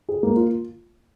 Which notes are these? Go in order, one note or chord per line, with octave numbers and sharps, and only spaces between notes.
G#4
A#3
F4